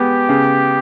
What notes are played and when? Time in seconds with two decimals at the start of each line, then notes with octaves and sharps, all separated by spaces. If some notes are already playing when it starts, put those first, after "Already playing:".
Already playing: G#3 B3 G4
0.29 C#3